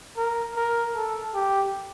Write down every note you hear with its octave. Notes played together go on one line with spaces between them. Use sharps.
A#4
A#4
A4
G4